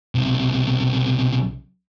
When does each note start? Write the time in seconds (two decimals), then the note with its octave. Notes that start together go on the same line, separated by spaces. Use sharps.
0.15 B1 C3